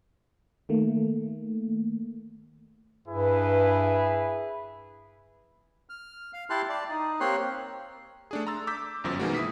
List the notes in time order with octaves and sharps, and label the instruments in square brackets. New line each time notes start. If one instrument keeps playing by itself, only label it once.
[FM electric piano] D#3 A3 A#3
[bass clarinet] G2 [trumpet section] E4 G#4 B4
[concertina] F6
F5
E4 G4 A5 C6 F#6
D5 A5
D#4
A#3 C4 G4 C#5 C6 F#6
[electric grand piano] A3 D4 G#4
A#5 C6 E6 A6
D6 E6 G6 B6
G1 F#2 F3
B2 D#3 E3 G#3 A#3 F#4
E4 D#6 B6